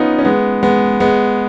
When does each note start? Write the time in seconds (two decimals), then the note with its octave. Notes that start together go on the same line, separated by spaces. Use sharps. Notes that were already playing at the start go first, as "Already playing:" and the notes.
Already playing: B3 C#4 D#4 F4
0.19 C#4
0.25 G#3 B3
0.63 G#3 B3
1.00 G#3 B3